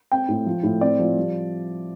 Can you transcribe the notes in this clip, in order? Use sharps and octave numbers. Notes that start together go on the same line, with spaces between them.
C4 G5
A2
F3
A2
C4 D5
F3
G3